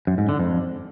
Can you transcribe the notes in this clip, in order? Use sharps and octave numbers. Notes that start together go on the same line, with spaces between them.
F#2
G#2
D3
F2